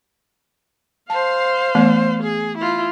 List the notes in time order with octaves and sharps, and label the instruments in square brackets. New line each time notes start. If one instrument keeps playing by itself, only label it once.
[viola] C5 F5 [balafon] A5
[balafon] E3 A3 B3
[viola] G#4
E4 F4